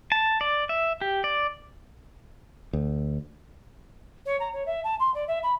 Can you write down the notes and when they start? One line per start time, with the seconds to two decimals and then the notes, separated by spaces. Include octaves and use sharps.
0.12 A5
0.41 D5
0.69 E5
1.01 G4
1.24 D5
2.73 D2
4.25 C#5
4.39 A#5
4.53 C#5
4.65 E5
4.83 A5
4.99 C6
5.14 D5
5.27 E5
5.42 B5